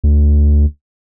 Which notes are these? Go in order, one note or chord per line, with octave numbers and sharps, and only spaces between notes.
D2